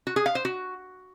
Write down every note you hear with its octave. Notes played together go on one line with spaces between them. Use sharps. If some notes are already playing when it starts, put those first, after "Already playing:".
F#4
G#4
F5
C5
F#4